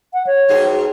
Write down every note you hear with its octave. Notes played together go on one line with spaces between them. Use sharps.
F#5
C#5
G#2 B2 G#4